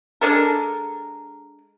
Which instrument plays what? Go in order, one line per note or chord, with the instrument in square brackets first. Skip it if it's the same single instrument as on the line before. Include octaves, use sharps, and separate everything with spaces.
[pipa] G#3 D4 A4 A#4